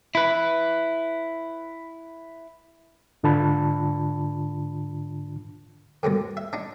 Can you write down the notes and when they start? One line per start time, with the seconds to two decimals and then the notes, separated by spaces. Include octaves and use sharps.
0.15 E4 B4
3.23 G#2 D3 D4 F4 A5 B5
6.03 G2 B2 D3 D#3
6.37 E5
6.53 D4 D#4